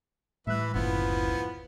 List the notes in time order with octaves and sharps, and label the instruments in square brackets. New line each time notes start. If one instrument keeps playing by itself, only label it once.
[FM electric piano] A2 F#6 [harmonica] E3 B4 [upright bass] G3 [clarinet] E5
[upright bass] F#1 D2 [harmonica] F3 B3 [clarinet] E4